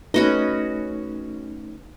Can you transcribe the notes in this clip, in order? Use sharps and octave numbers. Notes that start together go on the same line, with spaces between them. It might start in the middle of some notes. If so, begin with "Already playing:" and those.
A3 C#4 D#4 F#4 B4 D#5